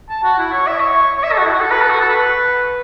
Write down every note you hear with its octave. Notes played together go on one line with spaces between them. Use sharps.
A5
F#4
E4
C#5
E5
C#5
C#5
E5
A4
F#4
E4
F#4
A4
B4
A4
F#4
A4
B4